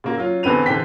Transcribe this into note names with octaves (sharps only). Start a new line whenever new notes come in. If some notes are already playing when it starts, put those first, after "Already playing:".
C#3 A#3 F#4
F#3 C#4 F4
E2 D3 C4 B4 D#7 F7
D3 E3 G4 C5 G5 B6